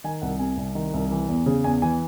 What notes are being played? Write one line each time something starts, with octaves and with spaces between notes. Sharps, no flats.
D#3 G#5
C2 F#5
C3 G#5
C2
D#3
C2
E3
E2
C#3
E2 G#5
E3 G#5